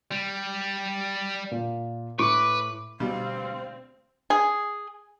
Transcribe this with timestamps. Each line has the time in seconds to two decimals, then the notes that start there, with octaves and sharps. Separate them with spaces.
0.11 G3
1.51 A#2
2.19 A2 B4 C#6 D6
3.00 D2 B2 G3 C4 F5
4.30 G#4